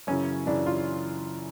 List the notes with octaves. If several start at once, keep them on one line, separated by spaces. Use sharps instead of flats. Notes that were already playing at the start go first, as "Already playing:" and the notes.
F#2 C#3 E3 C#4
F#2 C#3 E3 D4
F4